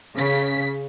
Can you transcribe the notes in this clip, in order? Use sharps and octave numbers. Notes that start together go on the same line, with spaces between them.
C#3 B6